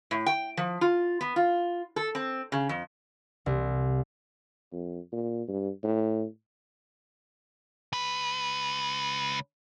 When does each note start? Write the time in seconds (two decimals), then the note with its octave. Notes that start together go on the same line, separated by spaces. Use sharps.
0.11 A2
0.26 G5
0.57 F3
0.81 F4
1.21 B3
1.36 F4
1.96 A4
2.15 C4
2.52 C#3
2.69 F2
3.46 C2
4.72 F2
5.12 A#2
5.48 G2
5.83 A2
7.93 C#2 B4